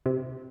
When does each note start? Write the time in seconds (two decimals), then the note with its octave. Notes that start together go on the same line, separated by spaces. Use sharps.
0.06 C3